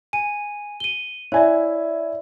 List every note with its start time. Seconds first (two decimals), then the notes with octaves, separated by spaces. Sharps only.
0.13 G#5 D#7
0.80 D#7 G7
1.32 E4 C#5 D5 E5 G#5